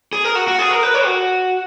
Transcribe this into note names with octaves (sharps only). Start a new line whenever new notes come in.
G#4
A#4
F#4
F#4
G#4
A#4
B4
C#5
F#4